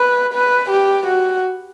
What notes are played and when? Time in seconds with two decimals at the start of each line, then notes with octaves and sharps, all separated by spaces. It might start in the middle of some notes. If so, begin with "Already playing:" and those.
Already playing: B4
0.33 B4
0.70 G4
1.07 F#4